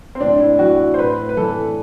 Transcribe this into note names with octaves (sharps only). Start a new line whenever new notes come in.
C4
A2 D4
E4
E3 F#4
C5
A2 B4
B4
E3 A4